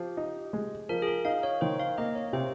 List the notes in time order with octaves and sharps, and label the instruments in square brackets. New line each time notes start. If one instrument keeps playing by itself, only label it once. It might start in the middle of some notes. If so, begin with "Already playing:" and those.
Already playing: [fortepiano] F3 [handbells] G4
[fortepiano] D#4
G#3
[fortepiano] F3 [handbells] A#4
[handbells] G#4
A#4
[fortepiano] D#4 [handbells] F5
[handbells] C#5
[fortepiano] D#3 [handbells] C5
[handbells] F5
[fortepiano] A#3 [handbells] D#5
[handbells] C#5
[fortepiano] C3 [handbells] C5